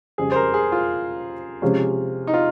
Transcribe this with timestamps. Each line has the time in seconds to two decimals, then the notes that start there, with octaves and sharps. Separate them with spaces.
0.18 F2 C#3 G3 G#4
0.32 C5
0.36 A#4
0.54 G#4
0.72 F4
1.62 C3 F3 G#3 C#4
2.27 D#4
2.34 F4